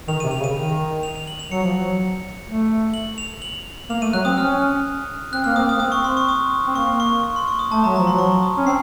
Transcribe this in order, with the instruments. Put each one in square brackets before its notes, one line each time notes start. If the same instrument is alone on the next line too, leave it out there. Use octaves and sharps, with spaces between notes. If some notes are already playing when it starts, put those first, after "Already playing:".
[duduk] D#3 [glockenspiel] F7
[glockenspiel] D#7
[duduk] C3
[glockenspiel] F7
[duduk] C#3
[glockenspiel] D#7
[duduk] D#3
[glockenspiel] F7
F7
F#7
F7
[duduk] F#3 [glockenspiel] C#7
[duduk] F3
F#3
A3
[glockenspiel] F#7
F7
F#7
[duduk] A#3 [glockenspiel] F7
[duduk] A3 [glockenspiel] D#7
[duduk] F#3 [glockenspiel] F#6
[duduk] C4 [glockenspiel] D#6
[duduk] C#4 [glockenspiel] F6
[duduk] C4 [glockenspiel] F#6
[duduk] A#3 [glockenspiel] F6
[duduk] C4 [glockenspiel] D#6
[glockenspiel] D#6
[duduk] A#3
[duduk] C4 [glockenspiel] D#6
[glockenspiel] C#6
C6
C#6
D#6
[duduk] C4
[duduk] A#3 [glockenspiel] C#6
[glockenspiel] C#6
C#6
C6
C#6
D#6
[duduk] A3 [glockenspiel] A5
[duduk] F#3 [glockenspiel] A#5
[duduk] F3 [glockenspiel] A#5
[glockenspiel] C6
[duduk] F#3
[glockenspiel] C#6
D#6
[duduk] C#4
[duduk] C4 [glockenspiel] C7